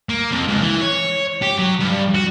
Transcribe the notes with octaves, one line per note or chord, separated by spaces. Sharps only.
A#3
F2
C#2
E3
C#5
G4
F#3
G2
F#4